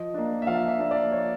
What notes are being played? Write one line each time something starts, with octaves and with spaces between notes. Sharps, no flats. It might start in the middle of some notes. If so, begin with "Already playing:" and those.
Already playing: F3 D#5
A#3 D4
E5
F3 F5
E5
A#3 D4
D5
F3 C#5